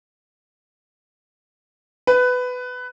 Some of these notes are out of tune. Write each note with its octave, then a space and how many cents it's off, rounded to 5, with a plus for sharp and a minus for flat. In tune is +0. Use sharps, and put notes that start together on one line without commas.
B4 +15